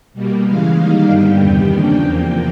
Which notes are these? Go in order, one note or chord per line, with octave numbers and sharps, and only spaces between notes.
B2 G3 A#3
C#3 E3 G#3 F5
D#3 G3 A#3 D#4
G2 D3 G3 B3 G5
E2 C3 D#3 G3 B3
C#3 F3 A#3 D4
E2 C3 F3 A#3